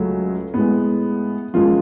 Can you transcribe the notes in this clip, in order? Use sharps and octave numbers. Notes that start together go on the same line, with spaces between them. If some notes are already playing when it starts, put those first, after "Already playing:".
Already playing: C#2 C#3 F#3 A3 C#4
A2 G#3 B3
F#2 F3 G#3 F4